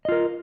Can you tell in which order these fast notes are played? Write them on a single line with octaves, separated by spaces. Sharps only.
D#5 F4 A#4